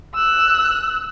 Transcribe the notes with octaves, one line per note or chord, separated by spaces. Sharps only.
E6 F#6